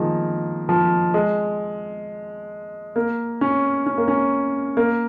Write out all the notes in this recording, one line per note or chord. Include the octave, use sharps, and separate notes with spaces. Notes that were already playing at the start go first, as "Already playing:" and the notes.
Already playing: D#3 F3 G#3 A#3
F3
G#3
A#3
C#4
C#4
A#3
C#4
A#3